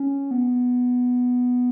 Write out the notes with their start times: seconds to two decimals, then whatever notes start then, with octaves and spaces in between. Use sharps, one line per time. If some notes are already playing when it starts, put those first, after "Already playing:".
Already playing: C#4
0.31 B3